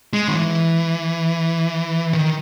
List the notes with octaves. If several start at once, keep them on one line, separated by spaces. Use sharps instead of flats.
G#3
D#3
E3
D#3